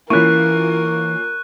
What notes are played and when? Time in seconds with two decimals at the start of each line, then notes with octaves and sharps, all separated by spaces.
0.10 E3 A#3 C#4 E4 F4 A#4 C#6 F#6